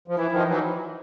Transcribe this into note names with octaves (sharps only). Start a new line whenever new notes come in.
F3
E3 E4
D#3 F3
D#4
E3 F#3